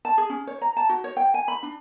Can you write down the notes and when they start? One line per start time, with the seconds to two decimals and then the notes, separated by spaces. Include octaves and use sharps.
0.05 A5
0.18 G#4
0.30 C#4
0.47 C#5
0.61 A#5
0.77 A5
0.89 F#4
1.04 C#5
1.17 G5
1.34 G#5
1.48 B5
1.63 D4